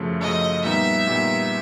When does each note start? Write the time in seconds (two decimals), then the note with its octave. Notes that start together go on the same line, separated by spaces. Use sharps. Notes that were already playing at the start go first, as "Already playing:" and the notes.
Already playing: F#2 C#3 F3 A3
0.20 F#2 C#3 F3 A3 D#5
0.64 A#2 G3 B3 D#4 E5
1.07 A#2 G3 B3 D#4